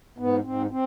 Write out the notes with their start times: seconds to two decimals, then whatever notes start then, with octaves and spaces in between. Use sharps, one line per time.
0.18 G#2 B3
0.44 G#2 C4
0.71 C4